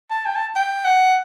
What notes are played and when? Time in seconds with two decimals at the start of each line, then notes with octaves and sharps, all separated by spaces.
0.11 A5
0.26 G5
0.36 A5
0.56 G5
0.85 F#5